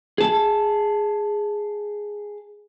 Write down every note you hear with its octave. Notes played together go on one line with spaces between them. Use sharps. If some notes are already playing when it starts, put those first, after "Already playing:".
G#4 A5